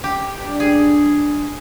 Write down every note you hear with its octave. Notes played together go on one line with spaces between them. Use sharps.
G4
G2 D4
G#4